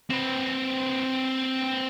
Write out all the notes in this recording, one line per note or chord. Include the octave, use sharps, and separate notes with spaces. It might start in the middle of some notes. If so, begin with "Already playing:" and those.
C4 B4